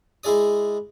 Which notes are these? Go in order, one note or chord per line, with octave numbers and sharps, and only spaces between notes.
G#3 E4 G#4 D5 D#6